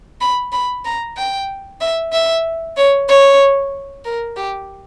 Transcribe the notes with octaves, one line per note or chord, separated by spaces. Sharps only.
B5
B5
A#5
G5
E5
E5
C#5
C#5
A#4
G4